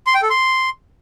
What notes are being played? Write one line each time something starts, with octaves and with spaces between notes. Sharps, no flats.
C6
G5
A4
C6